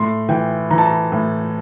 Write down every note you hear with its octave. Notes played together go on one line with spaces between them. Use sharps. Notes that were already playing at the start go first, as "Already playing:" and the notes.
Already playing: A2 C6
E3 G5
E3 A#5
A5
A#5
A2